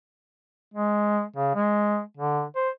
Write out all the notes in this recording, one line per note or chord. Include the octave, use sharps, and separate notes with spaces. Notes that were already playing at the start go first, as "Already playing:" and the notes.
G#3
C#3
G#3
D3
C5